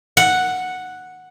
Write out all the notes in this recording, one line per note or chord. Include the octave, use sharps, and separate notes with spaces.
F#5